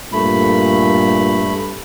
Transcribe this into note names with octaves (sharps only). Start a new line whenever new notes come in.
G2 A#2 A3 B5